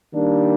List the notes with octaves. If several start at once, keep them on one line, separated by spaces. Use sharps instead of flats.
D#3 G3 A#3 D4